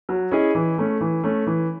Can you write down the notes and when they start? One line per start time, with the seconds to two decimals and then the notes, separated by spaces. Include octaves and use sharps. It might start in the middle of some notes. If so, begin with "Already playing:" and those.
0.09 F#3
0.31 C#4 E4 G#4 D#5
0.55 E3
0.78 A3 C#4
1.01 E3
1.23 A3 C#4
1.47 E3